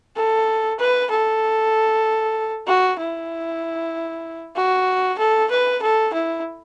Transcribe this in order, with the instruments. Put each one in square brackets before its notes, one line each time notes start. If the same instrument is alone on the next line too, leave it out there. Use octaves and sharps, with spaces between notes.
[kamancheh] A4
B4
A4
F#4
E4
F#4
A4
B4
A4
E4